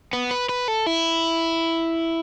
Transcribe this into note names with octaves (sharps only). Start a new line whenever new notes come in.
B3
B4
B4
A4
E4